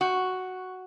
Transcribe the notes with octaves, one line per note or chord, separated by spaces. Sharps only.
F#4